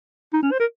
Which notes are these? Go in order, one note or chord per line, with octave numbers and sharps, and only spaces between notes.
D#4
C#4
C5
A#4